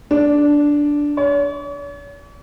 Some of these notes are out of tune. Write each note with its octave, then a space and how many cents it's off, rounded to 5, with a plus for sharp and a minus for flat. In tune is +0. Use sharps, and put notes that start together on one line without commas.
D4 -5
C#5 +45